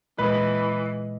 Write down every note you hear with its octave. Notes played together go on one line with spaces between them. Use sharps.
A#2 E3 G#3 B4 D#5